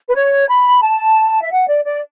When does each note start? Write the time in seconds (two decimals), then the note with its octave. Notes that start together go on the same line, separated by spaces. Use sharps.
0.09 B4
0.14 C#5
0.49 B5
0.82 A5
1.41 E5
1.52 F#5
1.68 D5
1.85 D5